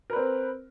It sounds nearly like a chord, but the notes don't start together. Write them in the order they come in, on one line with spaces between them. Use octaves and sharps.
A#4 B4 C4